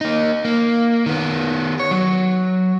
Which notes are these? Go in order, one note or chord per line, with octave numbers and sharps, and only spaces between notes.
A#3 D#4
A#3
D#3 B3
C#5
F#3